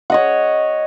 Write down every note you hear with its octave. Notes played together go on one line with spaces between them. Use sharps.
C#5 D#5 F#5